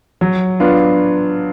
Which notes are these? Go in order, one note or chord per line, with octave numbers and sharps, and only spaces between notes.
F#3
B3 D4 F4